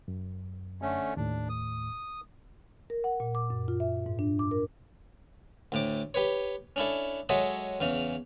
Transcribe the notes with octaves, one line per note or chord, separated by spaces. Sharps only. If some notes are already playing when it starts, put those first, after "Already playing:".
F#2
D3 A3 C#4
D#2 A2 D4
D#6
A#4
F#5
A#2
D6
F#2
F4
E5
G#2
D4
D6
A#4
D2 A2 D6
G4 B4 C#5
C#4 D4 E4 A4
F#3 G#3 A4 C#5 D#5 E5
E2 C#3 C#4